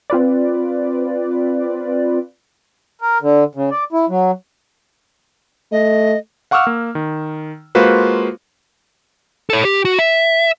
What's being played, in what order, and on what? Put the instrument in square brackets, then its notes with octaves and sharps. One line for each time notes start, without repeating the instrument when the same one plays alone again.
[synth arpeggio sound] C4 F4 B4 D5
[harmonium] A#4
D3
C#3
D5
E4
F#3
[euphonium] A3 [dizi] D#5
[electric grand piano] F5 F#5 C#6 D6 E6 F6
A#3
D#3
G#3 A#3 F4 F#4 B4 C5
[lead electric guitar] A4 C#5
G4
F#4
E5